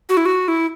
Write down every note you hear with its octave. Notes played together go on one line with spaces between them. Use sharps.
F#4
E4
F#4
E4